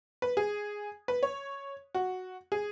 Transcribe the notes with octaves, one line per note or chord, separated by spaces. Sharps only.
B4
G#4
B4
C#5
F#4
G#4